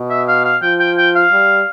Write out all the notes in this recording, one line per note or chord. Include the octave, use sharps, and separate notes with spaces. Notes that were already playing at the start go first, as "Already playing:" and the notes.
Already playing: B2
E5
F5
F5
F3 G5
G5
G5
F5
G3